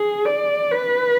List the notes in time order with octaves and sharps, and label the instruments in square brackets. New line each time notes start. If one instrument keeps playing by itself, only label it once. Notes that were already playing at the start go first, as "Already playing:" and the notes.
Already playing: [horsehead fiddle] G#4
D5
B4